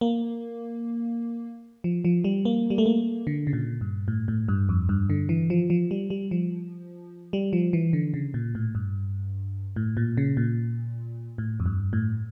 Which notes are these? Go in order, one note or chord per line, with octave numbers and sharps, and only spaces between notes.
A#3
F3
F3
G3
A#3
G3
A3
A#3
D3
C#3
A#2
G2
A2
A2
G2
F2
G2
D3
E3
F3
F3
G3
G3
F3
G3
F3
E3
D3
C#3
A#2
A2
G2
A2
A#2
C#3
A#2
A2
F2
G2
A2